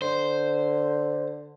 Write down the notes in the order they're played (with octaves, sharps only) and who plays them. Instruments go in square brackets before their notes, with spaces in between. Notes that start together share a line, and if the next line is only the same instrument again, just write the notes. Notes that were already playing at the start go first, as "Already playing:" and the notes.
[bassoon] D3 [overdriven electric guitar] C5